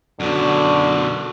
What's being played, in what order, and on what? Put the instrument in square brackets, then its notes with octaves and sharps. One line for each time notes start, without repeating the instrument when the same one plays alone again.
[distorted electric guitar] F#2 B2 [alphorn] D3